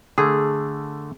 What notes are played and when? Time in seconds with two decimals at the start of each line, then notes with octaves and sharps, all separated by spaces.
0.18 D3 A3 G#4